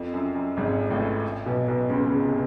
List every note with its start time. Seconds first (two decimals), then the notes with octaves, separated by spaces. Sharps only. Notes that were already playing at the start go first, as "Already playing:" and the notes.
Already playing: F2
0.14 F#2
0.35 F#2
0.57 G#1 G#2
0.91 A1 A2
1.46 B1 B2
1.68 B1 B2
1.90 C#2 C#3
2.06 C#2 C#3
2.23 C3